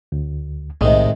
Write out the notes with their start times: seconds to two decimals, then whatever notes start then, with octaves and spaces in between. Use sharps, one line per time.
0.12 D2
0.81 B1 A2 C3 D#3 G#3 D#5